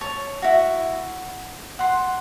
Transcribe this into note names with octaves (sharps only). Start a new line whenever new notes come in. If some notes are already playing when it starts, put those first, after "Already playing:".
C#5 A5
E4 F#4
F#5 C6